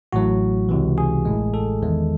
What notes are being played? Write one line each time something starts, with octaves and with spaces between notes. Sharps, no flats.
A1 A2 F#3 F#4
C#2 C3 E3
G#4
A1 A2 G#3
A4
E2 D#3 G#3